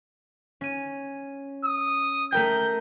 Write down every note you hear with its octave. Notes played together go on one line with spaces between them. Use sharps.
C#4 D#7
D#6
A3 A#4 G5 G6